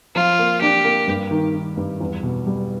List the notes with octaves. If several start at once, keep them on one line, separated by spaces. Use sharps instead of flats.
F3 F4
A#3
D4 G4
A#3
G2
D#3
D#3
G2
E2
B2
G3